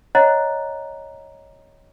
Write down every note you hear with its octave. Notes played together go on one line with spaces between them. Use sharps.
C#5 D#5 F#5 A#5 F#6 A6